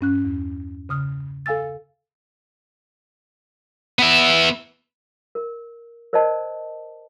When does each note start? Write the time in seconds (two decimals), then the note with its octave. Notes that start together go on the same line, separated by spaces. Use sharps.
0.01 G2 C#4 F#6
0.25 E2
0.89 C#3 D#6 F6
1.46 A4 F5 G#5 E6 A6
3.99 B3 E5
5.35 A#4
6.13 A#4 C5 D5 D#5 A5